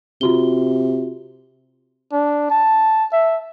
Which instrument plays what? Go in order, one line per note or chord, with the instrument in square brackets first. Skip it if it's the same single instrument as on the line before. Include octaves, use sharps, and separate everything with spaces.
[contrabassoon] C3 [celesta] F4 F#4 G7
[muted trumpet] D4
A5
E5